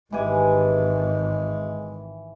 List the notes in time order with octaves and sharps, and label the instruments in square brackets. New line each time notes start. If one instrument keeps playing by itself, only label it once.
[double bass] G#1 [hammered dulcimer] E3 G4 G#5 [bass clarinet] G#3